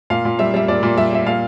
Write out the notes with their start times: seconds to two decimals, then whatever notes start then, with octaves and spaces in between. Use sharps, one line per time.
0.10 A#2 F5
0.25 A#2
0.39 G3 E5
0.54 G3 E5
0.68 A#2 D5
0.83 A#2
0.97 G3 E5
1.12 G3 E5
1.26 A#2 F5